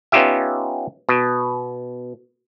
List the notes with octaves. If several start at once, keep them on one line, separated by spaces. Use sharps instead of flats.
B3 C#4 D#4 F4 G4 E5
B2